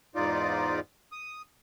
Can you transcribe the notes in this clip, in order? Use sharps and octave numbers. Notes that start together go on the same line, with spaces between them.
E2 G#2 D#4 F4 D5
D#6